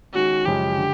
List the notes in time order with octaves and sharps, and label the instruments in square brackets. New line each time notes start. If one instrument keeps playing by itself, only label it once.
[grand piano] D#3 G#3 C#4 [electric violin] F#4
[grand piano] F#2 C#3 F3 G#3 [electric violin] G4
[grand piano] D3